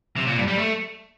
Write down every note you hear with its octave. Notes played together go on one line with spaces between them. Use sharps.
C3
A#2
G2
G3
A3